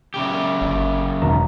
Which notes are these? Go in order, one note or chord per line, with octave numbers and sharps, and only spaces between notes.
F#2 C#3 G4
G1
E1 D#3 A#5